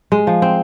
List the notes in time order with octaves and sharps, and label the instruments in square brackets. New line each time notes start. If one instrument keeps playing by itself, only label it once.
[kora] G#3
F3
C4